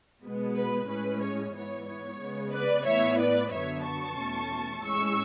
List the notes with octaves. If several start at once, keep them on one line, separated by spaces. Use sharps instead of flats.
B2 G#3 B3
B4
A2 G#3 C#4 B4
C#5
G#2 E3 B3 C#5
C#5
C#3 G#3 B3
B4 D5
A2 E3 B3 C#5 E5
B4 D5
F#2 D3 F#3 B3 C#5 E5
A5 C#6
E2 B2 A3 C#4
A2 G#3 C#4 C#6 E6